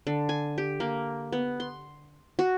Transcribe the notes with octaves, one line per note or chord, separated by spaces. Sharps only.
D3
G#5
G4
A#3
B3
C6
F#4